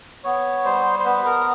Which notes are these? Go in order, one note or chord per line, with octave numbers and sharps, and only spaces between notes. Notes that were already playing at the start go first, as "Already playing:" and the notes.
B3 C#5
G3 C5
C5
B3 B4
A#4